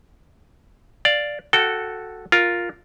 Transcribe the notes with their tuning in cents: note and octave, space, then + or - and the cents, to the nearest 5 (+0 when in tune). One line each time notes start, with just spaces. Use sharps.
D5 +0 F5 +0
F#4 -10 A4 +0 G5 -30
F4 +0 A#4 +0